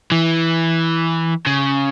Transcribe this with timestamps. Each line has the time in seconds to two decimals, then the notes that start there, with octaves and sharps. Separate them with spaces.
0.12 E3
1.47 C#3